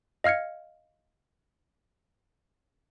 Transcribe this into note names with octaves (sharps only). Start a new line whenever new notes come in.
D#5 F5 F6 G#6 C#7